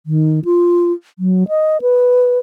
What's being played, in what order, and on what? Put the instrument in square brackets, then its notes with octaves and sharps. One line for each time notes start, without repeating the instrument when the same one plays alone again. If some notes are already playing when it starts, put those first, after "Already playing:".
[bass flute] D#3
F4
F#3
D#5
B4